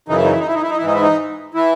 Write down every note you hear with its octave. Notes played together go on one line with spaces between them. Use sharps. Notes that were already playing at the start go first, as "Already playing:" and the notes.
F#2 C#3 E3 D#4
E4
D#4
E4
D#4
E4
D#4
E4
D#4
E4
G#2 E3 D#4
E4
D#4
E3 E4